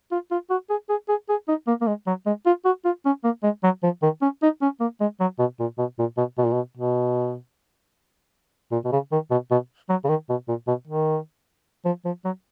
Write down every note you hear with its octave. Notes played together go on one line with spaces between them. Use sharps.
F4
F4
F#4
G#4
G#4
G#4
G#4
D#4
A#3
A#3
G#3
F#3
G#3
F4
F#4
F4
C#4
A#3
G#3
F#3
F3
D#3
C#4
D#4
C#4
A#3
G#3
F#3
B2
A#2
B2
A#2
B2
B2
A#2
B2
B2
A#2
B2
C#3
D#3
B2
B2
F#3
C#3
D#3
B2
A#2
B2
D#3
F3
F3
F#3